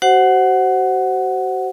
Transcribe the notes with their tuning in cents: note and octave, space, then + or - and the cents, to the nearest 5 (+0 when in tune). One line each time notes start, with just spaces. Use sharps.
F#4 +35 C5 +0 F#5 +0